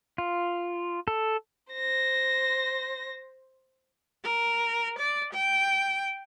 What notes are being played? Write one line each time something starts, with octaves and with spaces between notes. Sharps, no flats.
F4
A4
C5 A#6
A#4
D5
G5